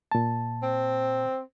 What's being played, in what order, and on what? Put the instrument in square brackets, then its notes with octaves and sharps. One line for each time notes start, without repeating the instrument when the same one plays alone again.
[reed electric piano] A#2 A5
[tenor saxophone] C4